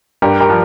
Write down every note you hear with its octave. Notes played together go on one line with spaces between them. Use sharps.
G2 G4 A#4
G4 A#4
F3